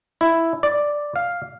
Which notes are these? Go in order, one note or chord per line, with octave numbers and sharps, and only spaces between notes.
E4
D5
F5